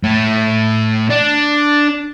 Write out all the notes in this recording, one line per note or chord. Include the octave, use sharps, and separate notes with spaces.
A2 A3
D4